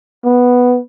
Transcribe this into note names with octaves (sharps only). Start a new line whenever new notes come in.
B3